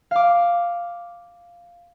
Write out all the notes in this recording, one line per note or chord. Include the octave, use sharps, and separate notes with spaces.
F5 D6